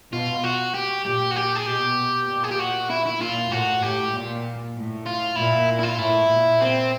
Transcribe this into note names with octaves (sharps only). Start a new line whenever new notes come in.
B2 F4
F#4
G4
A#2 G4
F#4
G4
G#4
B2 G4
A#2
G#4
G4
F#4
E4
E4
A#2 F4
A2 F#4
A2 G4
A#2
A2
F4
A#2 E4
E4
F4
A2 E4
A#2
C4